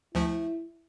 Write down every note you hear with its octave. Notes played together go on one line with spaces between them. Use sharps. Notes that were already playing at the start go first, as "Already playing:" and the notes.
D2 F3 A3 E4